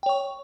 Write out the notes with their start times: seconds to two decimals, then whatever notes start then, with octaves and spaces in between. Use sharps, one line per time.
0.03 G5
0.06 C#5
0.09 C#6